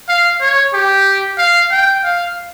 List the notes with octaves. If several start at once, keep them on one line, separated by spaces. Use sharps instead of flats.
F5
C#5
G4
F5
G5
F5